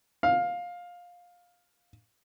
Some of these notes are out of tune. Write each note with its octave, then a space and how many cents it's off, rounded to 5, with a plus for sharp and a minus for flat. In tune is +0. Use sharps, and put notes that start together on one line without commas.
F5 +15